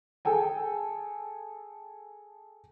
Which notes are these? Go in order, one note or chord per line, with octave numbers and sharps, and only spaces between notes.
G#4 A4 G5 G#5